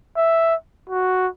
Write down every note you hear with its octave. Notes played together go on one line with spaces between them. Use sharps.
E5
F#4